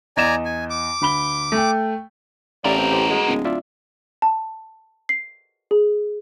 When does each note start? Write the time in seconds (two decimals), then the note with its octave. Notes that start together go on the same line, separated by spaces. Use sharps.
0.17 E2 D5 D#5 G#5 A#5 E7
0.45 G#5
0.70 D6
1.01 D2 B5 G7
1.52 A3 G5
2.64 A1 B3 E4 G4 A#4 D5 F5
2.77 C4
2.91 G4 C5
3.10 G#3 F#4
3.28 D1
3.45 F4 D5 E5
4.22 A5
5.09 C7
5.71 G#4